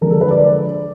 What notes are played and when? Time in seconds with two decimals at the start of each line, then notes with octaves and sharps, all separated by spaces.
0.01 D3 F3 G#3 A#4
0.10 A4
0.21 B4
0.31 D5